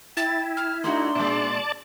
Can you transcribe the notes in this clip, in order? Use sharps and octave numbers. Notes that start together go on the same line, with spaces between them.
E4 G5 A6
F6
A3 D4 D#4 F#4 C6
A#2 G#3 D5 A5